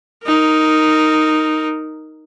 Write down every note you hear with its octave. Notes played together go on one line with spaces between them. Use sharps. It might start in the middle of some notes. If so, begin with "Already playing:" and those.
D#4 A#4